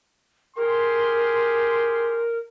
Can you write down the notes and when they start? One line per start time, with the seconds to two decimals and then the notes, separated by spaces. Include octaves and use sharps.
0.57 G4 G#4 A#4 C6